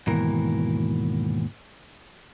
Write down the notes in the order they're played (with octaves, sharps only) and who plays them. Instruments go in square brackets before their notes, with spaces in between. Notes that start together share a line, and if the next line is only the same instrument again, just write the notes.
[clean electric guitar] D#2 G#2 B2 E3 A#4